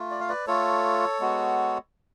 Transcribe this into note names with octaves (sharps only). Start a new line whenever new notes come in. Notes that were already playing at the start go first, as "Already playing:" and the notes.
Already playing: A3 F4
D5
F5
B4 D5
A3 F4 A4 C#5
G#3 B3 F#4